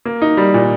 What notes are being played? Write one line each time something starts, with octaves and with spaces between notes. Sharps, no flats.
A#3
D#4
G3
A#2